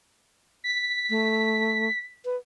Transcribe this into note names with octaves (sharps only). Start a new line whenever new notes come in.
B6
A3
B4